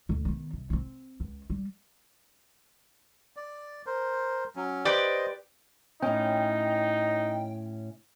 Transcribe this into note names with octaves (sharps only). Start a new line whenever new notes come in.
D2
D#3 B3
C2
C4 C#4
C#2
G3
D5
A#4 C5
F#3 C#4
G4 B4 C5 D5 D#5
A2 C#4 D#4 G5